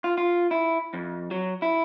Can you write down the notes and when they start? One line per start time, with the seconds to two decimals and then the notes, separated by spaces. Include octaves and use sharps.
0.04 F4
0.18 F4
0.51 E4
0.94 F2
1.31 F#3
1.62 E4